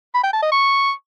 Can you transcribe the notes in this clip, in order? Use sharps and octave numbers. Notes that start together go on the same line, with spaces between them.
B5
G5
A5
D#5
C#6